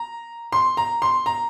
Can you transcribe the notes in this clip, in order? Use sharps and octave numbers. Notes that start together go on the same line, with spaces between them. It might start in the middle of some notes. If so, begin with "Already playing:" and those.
Already playing: A#5
C6
A#5
C6
A#5